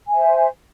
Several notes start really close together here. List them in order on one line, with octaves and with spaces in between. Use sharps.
G#5 E5 C5